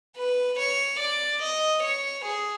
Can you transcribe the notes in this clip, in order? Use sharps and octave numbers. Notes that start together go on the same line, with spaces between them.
B4
C#5
D5
D#5
C#5
G#4